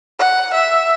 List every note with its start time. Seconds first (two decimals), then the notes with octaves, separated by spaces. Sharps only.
0.19 F#5
0.54 E5